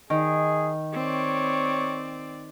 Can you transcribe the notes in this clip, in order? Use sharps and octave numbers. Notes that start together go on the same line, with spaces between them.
D#3 G#4
C4 C#5 D5